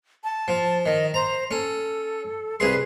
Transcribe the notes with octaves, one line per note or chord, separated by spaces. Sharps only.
A5
F3
D#3 D#5
C5 A#5
C#4 A4
C2 G#4 B4 C6